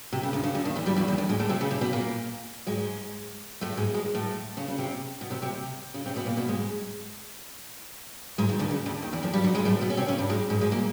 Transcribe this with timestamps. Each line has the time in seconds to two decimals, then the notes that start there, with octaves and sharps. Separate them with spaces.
0.13 C3
0.23 C#3
0.33 D2 D3
0.43 C#3
0.55 D2 D3
0.65 D#2 D#3
0.75 E2 E3
0.86 G2 G3
0.96 E2 E3
1.08 D#2 D#3
1.18 D2 D3
1.29 G#2 G#3
1.39 A2 A3
1.49 C3 C4
1.61 C#3 C#4
1.71 C3 C4
1.81 B2 B3
1.93 A#2 A#3
2.67 G#2 G#3
3.61 A2 A3
3.77 G#2 G#3
3.94 G#2 G#3
4.14 A2 A3
4.57 C#3 C#4
4.68 C#3 C#4
4.78 C3 C4
5.21 B2 B3
5.31 C3 C4
5.42 C3 C4
5.94 C#3 C#4
6.06 C3 C4
6.16 B2 B3
6.26 A#2 A#3
6.37 B2 B3
6.48 G#2 G#3
8.38 G#2 G#3
8.49 D#2 D#3
8.59 D2 D3
8.71 C#3
8.86 D2 D3
9.02 D#2 D#3
9.13 E2 E3
9.23 F2 F3
9.33 G2 G3
9.44 F#2 F#3
9.55 G#2 G#3
9.65 A2 A3
9.81 B2 B3
9.90 C#4
9.97 C3 C4
10.08 C#3 C#4
10.18 G2 G3
10.29 G#2 G#3
10.50 G#2 G#3
10.61 G#2 G#3
10.71 A#2 A#3